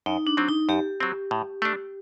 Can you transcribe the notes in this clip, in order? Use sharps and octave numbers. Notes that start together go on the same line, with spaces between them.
F#2 D#4
D4
F#3 C4
D#4
F#2 G4
F#3 C4
A2
A3 D4